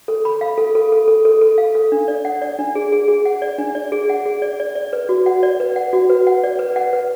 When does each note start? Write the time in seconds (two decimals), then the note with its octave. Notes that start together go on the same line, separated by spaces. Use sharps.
0.08 A4
0.25 B5
0.41 F5
0.58 A4
0.75 A4
0.92 A4
1.08 A4
1.25 A4
1.41 A4
1.58 F5
1.75 A4
1.92 D4
2.08 D5
2.25 F#5
2.42 D5
2.59 D4
2.75 G#4
2.92 G#4
3.08 G#4
3.26 F#5
3.42 D5
3.58 D4
3.75 D5
3.92 G#4
4.10 F#5
4.26 G#4
4.42 D5
4.60 D5
4.75 D5
4.93 B4
5.09 F#4
5.26 F#5
5.43 D5
5.60 B4
5.76 F#5
5.93 F#4
6.10 B4
6.27 F#5
6.43 D5
6.59 B4
6.76 F#5
6.93 B4